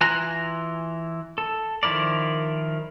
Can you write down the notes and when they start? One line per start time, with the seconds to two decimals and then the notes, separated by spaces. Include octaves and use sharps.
0.01 E3 F4 G#5 A#5 F#6
1.38 A4
1.83 D#3 F3 E4 A#4 D5